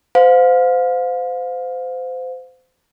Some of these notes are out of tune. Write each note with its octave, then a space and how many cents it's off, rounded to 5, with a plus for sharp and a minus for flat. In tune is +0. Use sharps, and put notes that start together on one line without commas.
C5 -30 F5 +30